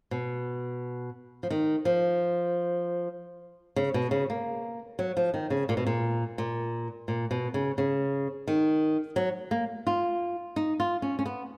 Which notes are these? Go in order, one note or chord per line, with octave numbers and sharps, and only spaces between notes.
B2
F3
D#3
F3
C#3
B2
C#3
A#3
F#3
F3
D#3
C#3
A#2
B2
A#2
A#2
A#2
B2
C#3
C#3
D#3
F#3
A#3
F4
D#4
F4
C#4
C#4
B3